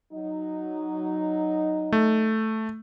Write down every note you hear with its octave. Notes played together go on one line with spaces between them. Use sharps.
F#3 D#4
A3